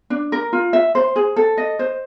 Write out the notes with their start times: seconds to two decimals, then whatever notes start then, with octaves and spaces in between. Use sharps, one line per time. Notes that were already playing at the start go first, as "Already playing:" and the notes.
0.10 D4
0.32 A#4
0.53 F4
0.73 E5
0.95 C5
1.16 G#4
1.36 A4
1.57 D#5
1.79 C5